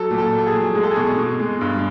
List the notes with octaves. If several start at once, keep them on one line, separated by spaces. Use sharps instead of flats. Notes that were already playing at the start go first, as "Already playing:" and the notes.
Already playing: F#3 A4
A#2
A4
A#2
A4
G#4
F#3
G#3 G#4
A4
G#4
B2
B2
G#3
G2